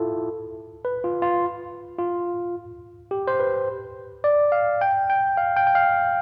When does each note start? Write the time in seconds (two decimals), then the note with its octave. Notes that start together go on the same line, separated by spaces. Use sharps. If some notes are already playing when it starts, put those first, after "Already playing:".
Already playing: E4 F4 A4
0.85 B4
1.04 F4
1.22 F4
1.99 F4
3.11 G4
3.27 C5
3.40 B4
4.24 D5
4.52 F5
4.81 G5
5.10 G5
5.37 F5
5.57 G5
5.67 G5
5.75 F5